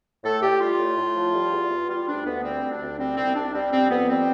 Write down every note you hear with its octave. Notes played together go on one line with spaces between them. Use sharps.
A2 A4
A2 G4
G3 F4
A2
A2
F3
G3
E2
E2
G3 F4
D2 D4
D2 B3
G3 C4
D2
D4
D2
G3 C4
C2 C4
C2 D4
G3 C4
F2 C4
F2 B3
G3 C4